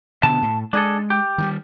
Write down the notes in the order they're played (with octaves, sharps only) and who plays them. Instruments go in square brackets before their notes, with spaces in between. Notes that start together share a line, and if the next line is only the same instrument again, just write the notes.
[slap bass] B2 D3 B3 [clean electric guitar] A5
[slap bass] A2
[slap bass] G#3 [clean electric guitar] D4 G#4 A4
[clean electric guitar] G4
[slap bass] D#3 F#3 G3